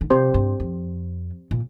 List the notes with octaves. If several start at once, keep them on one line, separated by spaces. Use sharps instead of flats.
D3
C3 C4 G4 C5
G2
F2
A#2